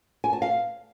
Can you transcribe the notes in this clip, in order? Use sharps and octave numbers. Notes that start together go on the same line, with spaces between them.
G#5
A5
F5